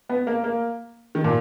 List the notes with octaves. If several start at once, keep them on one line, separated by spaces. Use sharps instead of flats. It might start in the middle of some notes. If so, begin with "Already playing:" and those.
B3
A#3
A#3
D#3
A#2